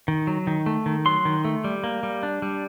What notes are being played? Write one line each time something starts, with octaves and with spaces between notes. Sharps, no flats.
D#3
F#3
D#3
A3
D#3
F#3 C6
D#3
A3
G3
A#3
G3
D4
G3